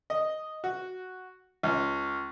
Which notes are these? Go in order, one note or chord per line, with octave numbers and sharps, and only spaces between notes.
D#5
F#4
C#2